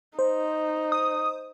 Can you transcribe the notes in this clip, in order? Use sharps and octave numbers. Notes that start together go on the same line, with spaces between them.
D#4 C5
D#6